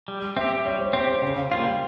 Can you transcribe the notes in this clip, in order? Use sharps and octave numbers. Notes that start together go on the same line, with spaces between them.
G3
C4 G4 E5
G3 C#5
C5
C4 G4 C5
C5
C#3
F5
G3 A#3 F4 F5
G5